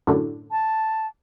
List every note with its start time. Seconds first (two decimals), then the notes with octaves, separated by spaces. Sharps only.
0.07 F#2 A2 D3
0.51 A5